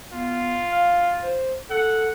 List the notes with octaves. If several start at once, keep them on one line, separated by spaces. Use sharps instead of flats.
B3 F4
F5
C5
A4 F#5